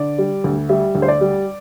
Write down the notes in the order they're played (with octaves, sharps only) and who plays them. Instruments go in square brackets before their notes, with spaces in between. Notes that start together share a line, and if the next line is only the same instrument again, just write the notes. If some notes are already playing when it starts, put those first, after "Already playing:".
Already playing: [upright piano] D3 D5
G3
D2
G3 E5
D2
C5
D5
G3